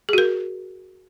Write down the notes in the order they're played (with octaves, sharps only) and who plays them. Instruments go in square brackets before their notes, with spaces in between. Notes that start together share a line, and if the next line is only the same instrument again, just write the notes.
[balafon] G#4
F#4
A#4